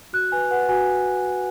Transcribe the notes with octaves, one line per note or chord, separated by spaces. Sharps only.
F#4 F#6
B4 G#5
B4 F#5
F#4 G#5